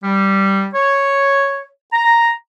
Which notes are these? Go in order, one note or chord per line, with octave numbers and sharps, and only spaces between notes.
G3
C#5
A#5